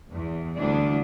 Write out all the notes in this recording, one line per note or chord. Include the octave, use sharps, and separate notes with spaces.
E2
D2 E3 G3 D4 D5